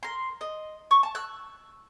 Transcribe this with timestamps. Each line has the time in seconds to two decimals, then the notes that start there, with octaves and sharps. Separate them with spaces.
0.03 A#4 C6
0.41 D#5
0.91 C#6
1.03 A5
1.15 E6 F#6